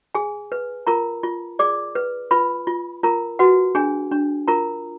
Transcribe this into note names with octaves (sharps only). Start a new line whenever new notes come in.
G#4 G#5
B4
F4 A#4 A#5
F4
G#4 D5 D6
B4
F4 B4 B5
F4
F4 A#4 A#5
F#4 B4 F#5
D4 G#4 G#5
D4
F4 A#4 A#5